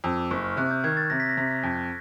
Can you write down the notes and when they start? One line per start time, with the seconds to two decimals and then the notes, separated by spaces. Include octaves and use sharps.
0.04 F2 E6
0.17 D6
0.31 F#1 C#6
0.44 F6
0.57 C3 F#6
0.71 G6
0.84 D#3 G#6
0.97 A6
1.10 C3 A#6
1.20 B6
1.29 A#6
1.37 C3
1.63 F2